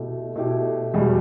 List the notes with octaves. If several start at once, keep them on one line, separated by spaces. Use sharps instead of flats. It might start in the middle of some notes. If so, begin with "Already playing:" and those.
Already playing: B2 A3 E4 G4
B2 A3 E4 G4
E2 B2 G3